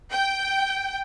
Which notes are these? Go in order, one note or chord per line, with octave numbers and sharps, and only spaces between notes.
G5